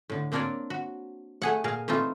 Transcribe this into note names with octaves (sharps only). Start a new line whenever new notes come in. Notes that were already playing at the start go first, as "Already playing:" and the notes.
A2 D3
A#3 C4 D4 A#4 C#5 D5
F#4
A3 G#4 F#5
A#2 G#4 A#4 F5
E3 A3 C4 D#4 F4